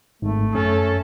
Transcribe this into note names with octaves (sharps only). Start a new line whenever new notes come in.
G#1 G#2 A3
F#2 C#4 A4